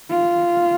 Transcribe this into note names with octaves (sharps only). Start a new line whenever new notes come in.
F4